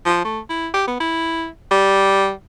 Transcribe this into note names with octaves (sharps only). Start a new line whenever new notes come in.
F3
A3
E4
G4
B3
E4
G3